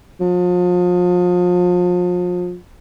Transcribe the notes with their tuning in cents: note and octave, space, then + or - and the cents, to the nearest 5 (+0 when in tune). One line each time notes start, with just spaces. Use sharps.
F3 +35